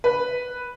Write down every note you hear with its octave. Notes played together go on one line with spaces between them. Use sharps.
B4